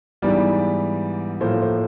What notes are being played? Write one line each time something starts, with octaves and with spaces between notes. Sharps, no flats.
G#2 E3 G3 B3 D5
A2 F3 A#3 C5
C5